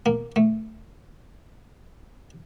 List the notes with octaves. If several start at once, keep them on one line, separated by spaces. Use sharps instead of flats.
A#3
A3